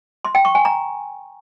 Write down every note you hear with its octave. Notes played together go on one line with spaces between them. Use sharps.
C6
G5
C#6
G#5
A#5